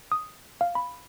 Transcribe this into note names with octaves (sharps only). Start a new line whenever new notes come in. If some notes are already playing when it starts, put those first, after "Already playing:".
D#6
F5
B5